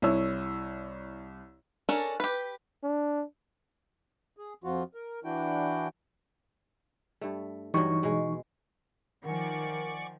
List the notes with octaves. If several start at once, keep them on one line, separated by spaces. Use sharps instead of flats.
C2 E4 C#5 E6
C#4 D4 A4 A#4 C#5
G4 B4
D4
G#4
F2 F3 F4 F#4
A#4
E3 D4 E4 F#4 G5
G2 A3
G2 E3 F#3 D#4 C#6
B2 G#3
D#3 F3 A#4 D5 F#5 G#5 C#6